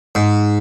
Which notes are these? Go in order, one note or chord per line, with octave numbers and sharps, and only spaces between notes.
G#2